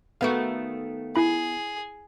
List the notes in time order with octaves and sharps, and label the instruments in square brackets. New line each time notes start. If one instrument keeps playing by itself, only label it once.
[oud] D#3 A3 F#4 [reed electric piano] B3 F5
[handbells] E4 B5 [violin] G#4